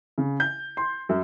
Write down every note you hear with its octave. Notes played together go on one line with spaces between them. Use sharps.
C#3
G6
C6
F#2